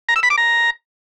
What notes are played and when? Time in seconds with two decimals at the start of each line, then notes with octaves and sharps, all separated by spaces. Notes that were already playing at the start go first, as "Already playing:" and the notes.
0.09 A#5
0.16 E6
0.23 B5
0.30 D6
0.38 A#5